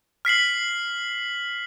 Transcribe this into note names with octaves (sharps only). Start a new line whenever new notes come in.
F6 B6 C7 F#7